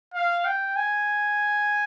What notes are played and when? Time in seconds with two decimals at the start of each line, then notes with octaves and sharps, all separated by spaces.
0.14 F5
0.45 G5
0.76 G#5